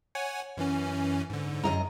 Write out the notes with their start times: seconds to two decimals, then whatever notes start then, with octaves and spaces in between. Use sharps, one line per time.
0.15 C#5 F#5 G#5
0.57 F#2 E3 C#4
1.30 G#2 D3
1.64 F#2 D#5 A#5